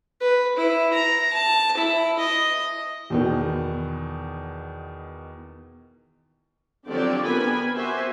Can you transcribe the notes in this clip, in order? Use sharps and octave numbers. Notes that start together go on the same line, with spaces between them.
B4
E4
A#5
A5
E4
D#5
E2 B2 D#3
D3 F3 F#3 C4 G4 D5
B3 C4 A#4 G#5 B5
F#4 G4 C5 E5 G#5